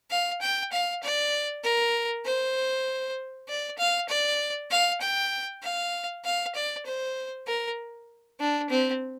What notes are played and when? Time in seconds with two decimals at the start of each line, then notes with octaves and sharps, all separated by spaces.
0.10 F5
0.41 G5
0.72 F5
1.03 D5
1.64 A#4
2.25 C5
3.48 D5
3.78 F5
4.09 D5
4.71 F5
5.01 G5
5.62 F5
6.25 F5
6.55 D5
6.86 C5
7.47 A#4
8.40 D4
8.70 C4